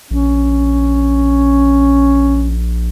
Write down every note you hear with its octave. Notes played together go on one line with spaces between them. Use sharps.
A#1 C#4